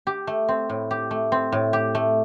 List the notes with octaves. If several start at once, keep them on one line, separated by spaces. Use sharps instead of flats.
G4
A3
C4
A2
G4
A3
C4
A2
G4
A3